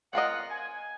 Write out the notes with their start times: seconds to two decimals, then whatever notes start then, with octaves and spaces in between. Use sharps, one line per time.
0.13 C4 F4 A#4 D#5 F#5
0.50 G#5